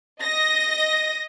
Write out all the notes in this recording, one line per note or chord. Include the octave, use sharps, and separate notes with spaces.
D#5 A#6